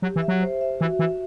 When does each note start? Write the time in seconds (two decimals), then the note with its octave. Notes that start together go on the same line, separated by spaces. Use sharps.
0.02 F#3 G4
0.16 E3
0.22 E5
0.28 F#3
0.41 C5
0.61 E5
0.80 E3 F#4
0.99 E3 E5